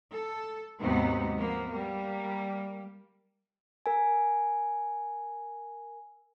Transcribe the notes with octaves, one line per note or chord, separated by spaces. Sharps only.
A4
D#2 G#2 C3 F#3 B3 D#4
F3 A#3 B3
G3 A#3
A#4 G#5